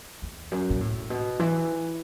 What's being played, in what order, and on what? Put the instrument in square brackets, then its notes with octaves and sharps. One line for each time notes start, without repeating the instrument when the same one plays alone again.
[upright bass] E2
F#2
B2
A2
B2
E3